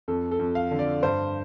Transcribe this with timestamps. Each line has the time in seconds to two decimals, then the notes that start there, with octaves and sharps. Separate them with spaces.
0.08 F2 A4
0.31 A4
0.39 F2
0.55 F5
0.71 D3
0.79 D5
1.03 G2 C5